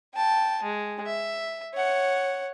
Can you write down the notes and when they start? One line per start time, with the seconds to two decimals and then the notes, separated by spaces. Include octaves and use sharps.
0.14 G5 A5
0.63 G#3
1.06 E5
1.74 C#5 F#5